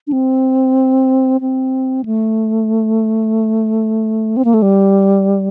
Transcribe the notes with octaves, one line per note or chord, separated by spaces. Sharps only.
D4
C4
C4
A3
C4
A#3
A3
G3